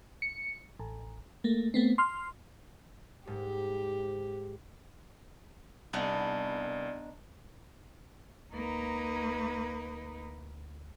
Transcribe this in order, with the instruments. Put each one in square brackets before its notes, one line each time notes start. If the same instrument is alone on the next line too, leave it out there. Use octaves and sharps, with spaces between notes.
[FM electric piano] C#7
A1
A3 A#3
A3 B3 C4
C6 F6
[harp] G#2 [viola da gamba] G4
[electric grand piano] C2 [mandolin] B3 D4 D#4 [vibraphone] D5
[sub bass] D2 [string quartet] A#3 D#4 B4